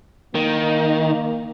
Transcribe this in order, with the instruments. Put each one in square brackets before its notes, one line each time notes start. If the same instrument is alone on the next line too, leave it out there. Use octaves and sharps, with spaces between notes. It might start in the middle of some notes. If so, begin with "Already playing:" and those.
[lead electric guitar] D#3 [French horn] A#3